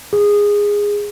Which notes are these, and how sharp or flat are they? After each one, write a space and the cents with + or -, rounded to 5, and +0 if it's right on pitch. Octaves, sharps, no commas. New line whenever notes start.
G#4 -15